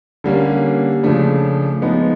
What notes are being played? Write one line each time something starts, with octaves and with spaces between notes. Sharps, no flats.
D3 G3 A#3 C#4
C#3 F3 A3 D4
F3 G#3 B3 D#4